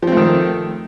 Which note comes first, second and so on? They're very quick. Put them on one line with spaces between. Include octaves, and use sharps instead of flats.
F3 C4 A3 D#3